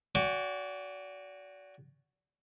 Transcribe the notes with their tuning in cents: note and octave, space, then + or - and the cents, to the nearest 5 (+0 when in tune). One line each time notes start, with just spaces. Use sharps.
F#4 +0 D5 -35 G5 +40